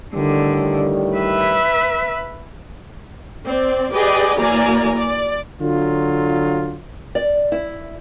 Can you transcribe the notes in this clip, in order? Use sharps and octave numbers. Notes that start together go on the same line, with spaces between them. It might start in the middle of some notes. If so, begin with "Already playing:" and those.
A2 D3 D#3 G3
B4 E5
C4 D5
G4 G#4 B4 D5 D#5 G#5
E3 F#3 A#3 D5 G#5 A#5
D5
D3 F#3 F4
D5
E4